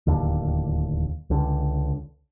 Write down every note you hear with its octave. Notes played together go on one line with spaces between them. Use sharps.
D1 A1 D#2 D3
C#2 D3